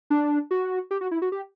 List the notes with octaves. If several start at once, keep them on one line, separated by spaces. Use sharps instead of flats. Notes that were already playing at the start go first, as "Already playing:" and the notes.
D4
F#4
G4
F#4
E4
F#4
G4